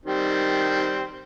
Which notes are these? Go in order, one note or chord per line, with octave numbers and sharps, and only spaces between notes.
D#3 G3 C4